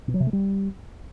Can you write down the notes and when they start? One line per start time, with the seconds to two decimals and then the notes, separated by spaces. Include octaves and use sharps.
0.08 B2
0.14 F#3
0.20 C3
0.27 A3
0.33 G3